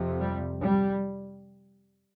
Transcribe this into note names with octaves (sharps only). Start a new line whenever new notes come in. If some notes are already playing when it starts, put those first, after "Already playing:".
Already playing: F2 C3
G3
G3